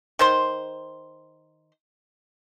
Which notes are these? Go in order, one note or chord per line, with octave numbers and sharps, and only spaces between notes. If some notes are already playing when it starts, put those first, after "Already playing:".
D#3 C5 C6